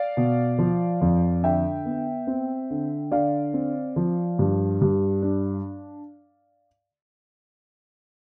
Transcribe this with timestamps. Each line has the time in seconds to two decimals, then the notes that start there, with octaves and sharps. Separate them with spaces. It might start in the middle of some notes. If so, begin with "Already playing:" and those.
Already playing: D5 F5
0.17 B2
0.58 F3
1.01 F2
1.43 D3 E5 G5
1.85 B3
2.27 C4
2.70 D3
3.12 D3 D5 F5
3.54 C4
3.96 F3
4.39 G2
4.81 G2
5.22 D4